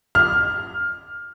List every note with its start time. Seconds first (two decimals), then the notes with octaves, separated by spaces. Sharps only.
0.15 F6